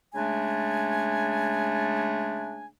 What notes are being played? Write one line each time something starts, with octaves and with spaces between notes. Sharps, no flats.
C#3 G#3 A3 D4 G#5